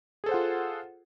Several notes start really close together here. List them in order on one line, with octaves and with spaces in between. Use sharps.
G#4 A4 C5 F#5 F4